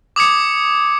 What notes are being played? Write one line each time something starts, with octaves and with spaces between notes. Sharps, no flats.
D6 D#6 G#6 C#7